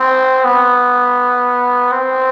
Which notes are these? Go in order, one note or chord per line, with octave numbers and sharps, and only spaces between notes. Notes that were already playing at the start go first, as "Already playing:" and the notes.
Already playing: C4
B3
C4